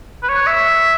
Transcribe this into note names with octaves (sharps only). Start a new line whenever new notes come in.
B4
C#5
E5